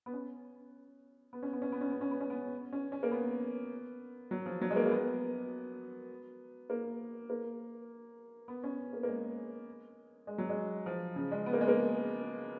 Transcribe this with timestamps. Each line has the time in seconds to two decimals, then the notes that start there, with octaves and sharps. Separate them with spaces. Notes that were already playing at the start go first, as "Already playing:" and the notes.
0.06 B3
0.13 C#4
1.33 B3
1.43 C#4
1.53 B3
1.62 C#4
1.72 B3
1.81 C#4
1.91 B3
2.01 C#4
2.11 B3
2.20 C#4
2.30 B3
2.73 C#4
2.92 C#4
3.03 A#3
3.11 B3
4.31 F#3
4.46 F3
4.61 F#3
4.70 G#3
4.76 A#3
4.86 A#3
4.91 B3
6.70 A#3
7.30 A#3
8.48 B3
8.64 C#4
8.93 A#3
9.03 A#3
9.08 G#3
10.27 G#3
10.38 F#3
10.49 G#3
10.86 F3
11.16 C#3
11.32 G#3
11.46 B3
11.53 A#3
11.61 G#3
11.68 A#3